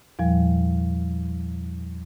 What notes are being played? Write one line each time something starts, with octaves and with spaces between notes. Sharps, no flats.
E2 A#2 F3 G3